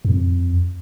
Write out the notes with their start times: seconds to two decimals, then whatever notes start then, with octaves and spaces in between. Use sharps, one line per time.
0.05 F2